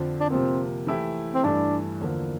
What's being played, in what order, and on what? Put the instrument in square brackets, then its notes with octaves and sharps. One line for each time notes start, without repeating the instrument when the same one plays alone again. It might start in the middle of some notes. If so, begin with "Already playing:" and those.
Already playing: [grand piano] F2 D3 F3 C4
[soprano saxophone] D4
[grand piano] C3 F3 A#3 [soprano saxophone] C4
[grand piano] E3 A3 E4 G4
[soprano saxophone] C4
[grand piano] G2 E3 A3 [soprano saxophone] D4
[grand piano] E2 D3 F3 A#3